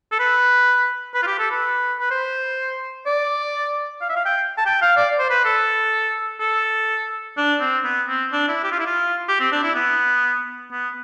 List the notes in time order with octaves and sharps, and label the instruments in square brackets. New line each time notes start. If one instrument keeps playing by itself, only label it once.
[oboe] A4
B4
B4
F4
G4
A4
B4
B4
C5
D5
F5
E5
F5
G5
A5
G5
F5
D5
C5
B4
A4
A4
D4
C4
B3
C4
D4
E4
G4
F4
E4
F4
G4
C4
D4
E4
B3
B3